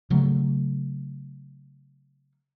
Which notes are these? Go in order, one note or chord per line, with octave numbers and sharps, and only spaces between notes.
C#3 F#3 A3